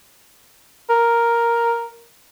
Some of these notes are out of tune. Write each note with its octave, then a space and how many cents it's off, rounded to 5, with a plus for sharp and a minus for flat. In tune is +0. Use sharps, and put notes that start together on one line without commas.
A#4 +5